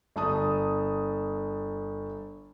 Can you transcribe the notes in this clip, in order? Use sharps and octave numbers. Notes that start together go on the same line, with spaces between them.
G1 A5 D#6